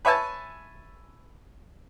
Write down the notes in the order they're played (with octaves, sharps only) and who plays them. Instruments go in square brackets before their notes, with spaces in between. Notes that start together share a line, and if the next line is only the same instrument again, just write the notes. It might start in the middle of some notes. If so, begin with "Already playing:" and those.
[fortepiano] B4 C#5 E5 G#5 A5